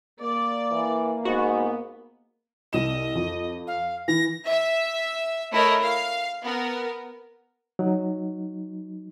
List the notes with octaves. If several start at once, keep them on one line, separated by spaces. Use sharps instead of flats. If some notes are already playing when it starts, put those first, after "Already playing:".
A#3 D5
E3
G#2 B3 F#4
C2 D#5 E7
F2
F5
E3 A#6
E5
A3 E4 A#4 C#5 D#5
F5
B3 A#4
F#3 D#4